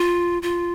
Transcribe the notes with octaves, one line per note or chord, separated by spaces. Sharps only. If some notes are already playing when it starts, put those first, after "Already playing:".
Already playing: F4
F4